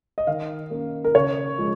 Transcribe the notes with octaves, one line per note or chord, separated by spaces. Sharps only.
D#5
D#3 F5
A#3 C#4
A#4
C#3 C#5
F3 G#3